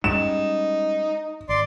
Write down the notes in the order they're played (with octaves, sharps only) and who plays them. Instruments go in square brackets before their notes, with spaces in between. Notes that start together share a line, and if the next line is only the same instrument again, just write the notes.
[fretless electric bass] G3 G#3 C#4 [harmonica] D#4 [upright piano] E7
[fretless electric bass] G#1 [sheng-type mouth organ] D5 C6